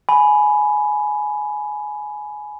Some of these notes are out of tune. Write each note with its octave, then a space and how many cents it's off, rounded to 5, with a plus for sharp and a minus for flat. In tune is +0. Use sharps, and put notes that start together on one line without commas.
G#5 +15 B5 +0